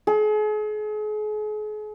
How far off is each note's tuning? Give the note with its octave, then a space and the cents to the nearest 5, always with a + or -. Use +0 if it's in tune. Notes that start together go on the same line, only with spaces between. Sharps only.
G#4 +40